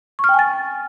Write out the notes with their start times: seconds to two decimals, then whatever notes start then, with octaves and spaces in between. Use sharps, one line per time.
0.19 C#6
0.24 F6
0.29 G5
0.34 G#5
0.39 A6